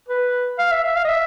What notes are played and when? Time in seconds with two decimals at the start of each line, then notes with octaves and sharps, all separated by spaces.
0.09 B4
0.59 F5
0.72 E5
0.84 E5
0.96 F5
1.05 D#5
1.09 E5